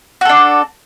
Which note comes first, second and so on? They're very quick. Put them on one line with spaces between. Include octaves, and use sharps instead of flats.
F#4 A4 D4